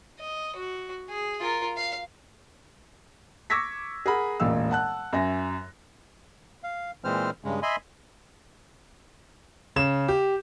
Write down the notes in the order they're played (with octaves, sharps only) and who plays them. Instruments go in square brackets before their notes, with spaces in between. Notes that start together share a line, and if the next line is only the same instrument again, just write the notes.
[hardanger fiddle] D#5
F#4
G#4
F4 A#4
F5
[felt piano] C#6 D6 E6 G#6 A#6 B6
G#4 A#4 F#5 B5
E1 A1 A#2 F5 E6
F#5 A5 F#6
F#2 E5 G#5 A#6
[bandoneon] F5
A#2 E3 G#3 C4 C5 F6
G2 C#3 G#3
D#5 E5 G#5 B5 C6
[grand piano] C#3 E7
G4